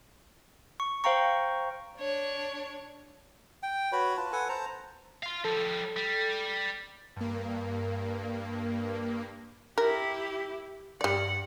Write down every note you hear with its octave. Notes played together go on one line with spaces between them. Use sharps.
C#6
C5 F5 G5 A#5 C#6
D4 C#5
G5
F#4 B4 C#5 B5
F4 B4 A5
A4 B4 F#5 G#5
C5 A5 A#5
F5 C6
F3 G3 A4
G3
G2 A#3
E4 G4 A#4
G2 G3 D5 F#5